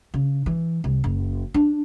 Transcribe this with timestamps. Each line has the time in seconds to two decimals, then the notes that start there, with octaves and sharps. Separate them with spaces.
0.14 C#3
0.46 E3
0.84 C2
1.04 F#1
1.54 D4